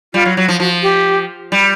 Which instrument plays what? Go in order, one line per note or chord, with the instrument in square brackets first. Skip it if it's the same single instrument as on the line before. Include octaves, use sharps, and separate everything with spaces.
[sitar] G3 [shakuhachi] F4
[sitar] F#3
F#3
F3
[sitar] F3 [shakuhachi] F#4
[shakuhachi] G4
[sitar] G3